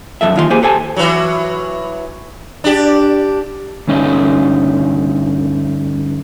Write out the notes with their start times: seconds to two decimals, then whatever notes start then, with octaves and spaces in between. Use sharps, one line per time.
0.21 F#2 C#3 F3 A4 E5
0.36 D#2 E3 F4 D5 C6
0.50 A#3 G4 G#4 C5 G#5
0.62 G4 A4 C5 G#5 A5
0.96 E3 F#3
2.64 D4 G4
3.87 D2 G2 C#4 D#4 D#5